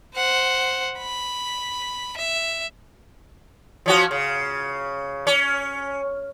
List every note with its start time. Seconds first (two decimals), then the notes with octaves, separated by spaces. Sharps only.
0.15 C5 F#5
0.99 B5
2.17 E5
3.86 F3 C#4 F#4
4.11 C#3
5.27 C#4